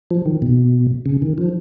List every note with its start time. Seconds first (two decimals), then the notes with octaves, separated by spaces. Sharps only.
0.11 F3
0.26 D#3
0.42 B2
1.06 C#3
1.22 D#3
1.38 F3